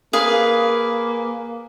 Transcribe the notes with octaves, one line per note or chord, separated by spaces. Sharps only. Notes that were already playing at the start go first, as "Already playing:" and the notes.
A#3 G#4 B4 F5